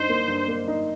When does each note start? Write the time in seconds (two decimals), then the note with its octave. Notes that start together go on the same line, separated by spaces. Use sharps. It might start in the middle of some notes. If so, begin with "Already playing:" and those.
Already playing: G2 D#4 C5
0.09 A#3
0.28 G2
0.48 A#3
0.68 D#4